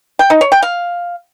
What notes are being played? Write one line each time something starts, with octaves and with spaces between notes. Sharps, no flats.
G5
D#4
C#5
G5
F5